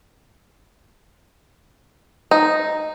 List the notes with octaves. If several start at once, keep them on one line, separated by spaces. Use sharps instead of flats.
D#4